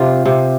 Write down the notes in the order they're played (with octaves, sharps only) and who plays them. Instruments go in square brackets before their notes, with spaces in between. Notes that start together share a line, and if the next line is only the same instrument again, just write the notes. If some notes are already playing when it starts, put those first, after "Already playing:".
Already playing: [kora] C3 F4
C3